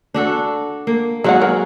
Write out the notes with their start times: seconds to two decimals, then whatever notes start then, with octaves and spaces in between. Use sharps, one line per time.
0.14 D4 F#4 A4
0.87 A#3
1.24 D#3 F#3 G#3 A#3 F#4 F#5
1.42 A#4